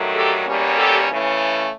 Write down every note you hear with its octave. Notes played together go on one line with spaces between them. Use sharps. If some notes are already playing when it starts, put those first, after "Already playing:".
Already playing: G2 D#3 F#3 A3
G4 A4
E2 B2 G3 A#3 C#4
G4 A4
C#3 E3 A3 C#4